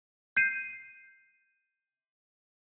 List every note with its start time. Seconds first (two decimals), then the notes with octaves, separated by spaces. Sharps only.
0.37 G6 C7 D#7